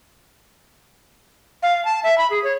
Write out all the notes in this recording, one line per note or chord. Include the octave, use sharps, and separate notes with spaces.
F5
A5
E5
B5
G#4
C#5